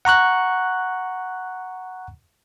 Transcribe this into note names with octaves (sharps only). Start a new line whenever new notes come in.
F#5 A#5 C#6 F#6